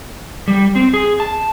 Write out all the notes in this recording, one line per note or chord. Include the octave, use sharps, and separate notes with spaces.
G3
C4
G#4
A5